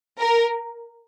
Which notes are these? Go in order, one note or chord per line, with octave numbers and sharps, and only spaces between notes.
A#4